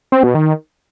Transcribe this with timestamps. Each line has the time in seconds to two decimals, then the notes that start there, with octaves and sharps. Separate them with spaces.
0.12 C4
0.23 B2
0.35 D#3